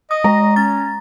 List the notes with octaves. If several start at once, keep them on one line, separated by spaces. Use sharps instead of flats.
D#5 D#6
G#3 A#5
C#4 A6